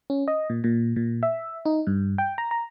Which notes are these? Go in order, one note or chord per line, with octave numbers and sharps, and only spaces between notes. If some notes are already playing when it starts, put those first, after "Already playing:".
C#4
D#5
A#2
A#2
A#2
E5
D#4
G2
G5
A#5
A#5